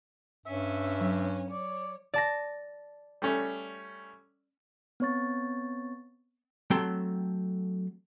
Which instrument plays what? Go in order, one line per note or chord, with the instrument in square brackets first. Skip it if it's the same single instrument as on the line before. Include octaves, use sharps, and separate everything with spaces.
[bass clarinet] G2 [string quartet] C#4 [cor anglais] E5
[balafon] F#3
[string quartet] C#5 [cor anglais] D5
[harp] D5 A5 A#6
[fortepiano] G3 A3 C#4
[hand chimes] B3 C4 C#5 C#6 A6
[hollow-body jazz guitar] F#3 A3 C4 A4 G5 C6